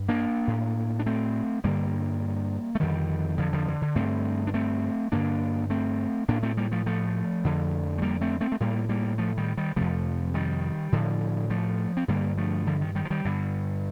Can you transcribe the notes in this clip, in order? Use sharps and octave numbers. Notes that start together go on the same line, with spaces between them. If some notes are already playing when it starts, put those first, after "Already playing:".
Already playing: G2
A#3 D4
A2
D4
A3 C4
G2 D3 G3 A#3
A3
F2 D3 D#3 G3
D3 F3
D3 F3
D3
D3
G2 D3 A3 C4
D4
A3 C4
G2 D3 A#3 D4
A3 C4
A2 A#3 D4
A3 C4
G3 A#3
F3 A3
F3 A3
F2 D3
A3
G3 A#3
A3 C4
A3 C4
A3
A2 G3 A#3
G3 A#3
F3 A3
D#3 G3
D#3 G3
F2 C3 F3 A3
D#3 G3
A2 D3 F3
F3 A3
C4
G2 D3 G3 A#3
F3 A3
D3 F3
D#3
D#3 G3
F3
D#3 G3
G2 D3